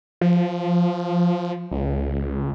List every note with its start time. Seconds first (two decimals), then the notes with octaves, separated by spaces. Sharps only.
0.21 F3
1.71 C#2